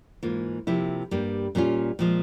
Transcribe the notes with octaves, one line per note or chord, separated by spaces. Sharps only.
G#2 E3 A#3 F4
C3 F3 A#3 E4
G2 G3 A#3
A#2 G3 C#4 F4
A#2 F3 G#3